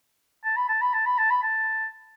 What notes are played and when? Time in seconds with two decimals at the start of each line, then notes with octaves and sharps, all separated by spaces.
0.44 A5
0.56 B5
0.68 A5
0.81 B5
0.93 A5
1.06 B5
1.18 A5
1.30 B5
1.42 A5